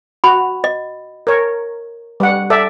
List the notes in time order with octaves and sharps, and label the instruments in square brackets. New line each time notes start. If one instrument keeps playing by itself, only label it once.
[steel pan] F#4 [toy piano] B5
[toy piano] D#5
[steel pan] A#4 C#5
G3 F#5
A4 D5 E5